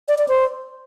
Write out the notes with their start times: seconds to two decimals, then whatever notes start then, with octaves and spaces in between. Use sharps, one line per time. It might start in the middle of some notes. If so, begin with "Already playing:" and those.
0.08 D5
0.18 D5
0.28 C5